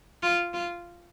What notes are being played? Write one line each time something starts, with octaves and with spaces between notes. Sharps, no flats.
F4
F4